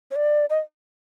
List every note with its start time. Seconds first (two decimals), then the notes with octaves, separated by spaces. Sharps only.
0.11 C#5
0.16 D5
0.50 D#5